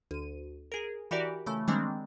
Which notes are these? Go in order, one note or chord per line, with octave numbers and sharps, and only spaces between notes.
D2 D#7
G#4 A#4
E3 F#4 G4 A#4 D5
C#3 E3 A3
D#3 G3 G#3 A#3 C4 D4